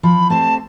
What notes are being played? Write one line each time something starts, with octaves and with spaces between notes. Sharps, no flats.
F3 B5
A3 C4 G4 C5 A5